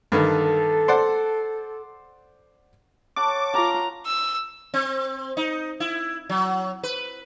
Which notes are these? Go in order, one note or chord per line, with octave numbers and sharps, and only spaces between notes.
G2 D3 D#3 A4
C5 D5 F#5
A4 C#5 F#5 D6
F4 A#4 A#5
E6
C4
D#4
E4
F#3
B4